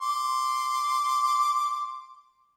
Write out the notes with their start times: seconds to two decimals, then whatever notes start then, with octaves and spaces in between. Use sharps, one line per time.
0.01 C6 D6